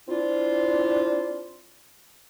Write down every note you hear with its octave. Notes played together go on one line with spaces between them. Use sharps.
C4 D4 E4 F4